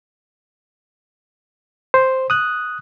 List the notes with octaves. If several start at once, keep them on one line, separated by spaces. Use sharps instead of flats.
C5
D#6 F#6